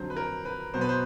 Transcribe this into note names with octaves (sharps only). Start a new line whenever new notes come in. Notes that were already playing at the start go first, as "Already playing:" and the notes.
Already playing: F2 D3 F#3 C5
B4
A#4
B4
B2 F#3 B3 C5
B4
C5